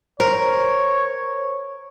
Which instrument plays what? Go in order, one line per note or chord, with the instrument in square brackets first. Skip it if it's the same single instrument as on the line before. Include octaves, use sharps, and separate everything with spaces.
[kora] A#4 [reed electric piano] C5 [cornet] C#5